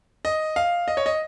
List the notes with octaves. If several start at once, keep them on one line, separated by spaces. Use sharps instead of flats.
D#5
F5
D#5
C#5
D#5